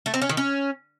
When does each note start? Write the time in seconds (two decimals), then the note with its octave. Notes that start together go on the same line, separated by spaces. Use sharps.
0.06 A3
0.14 C4
0.22 C#4
0.29 D#3
0.37 C#4